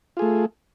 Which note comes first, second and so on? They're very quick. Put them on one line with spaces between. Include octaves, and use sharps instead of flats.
F4 G#4 A3